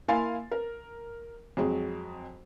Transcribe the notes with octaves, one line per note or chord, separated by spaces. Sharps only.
A#3 E4 F5 G#5 C6 A6
A#4
F2 F#3 G#3